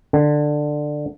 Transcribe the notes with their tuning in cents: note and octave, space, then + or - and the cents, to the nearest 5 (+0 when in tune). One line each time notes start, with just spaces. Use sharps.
D3 +15